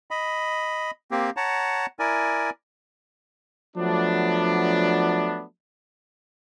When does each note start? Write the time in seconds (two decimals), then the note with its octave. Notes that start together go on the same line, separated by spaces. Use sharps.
0.11 D#5 B5
1.11 A#3 C4 G4
1.37 C#5 F#5 A5 A#5
1.99 E4 A#4 D5 G#5
3.77 F3 F#3 A3 B3 D4